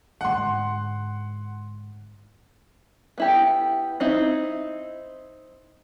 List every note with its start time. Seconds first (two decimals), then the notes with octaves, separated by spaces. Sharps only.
0.21 G#2 D3 F#5 C6
3.18 B3 E4 G4
4.00 C4 D#4 E4